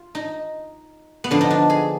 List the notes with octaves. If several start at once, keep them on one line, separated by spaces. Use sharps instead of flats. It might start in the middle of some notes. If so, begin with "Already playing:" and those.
Already playing: F4
D#4
B3
D3 F3 D4
D#4
D4
G#4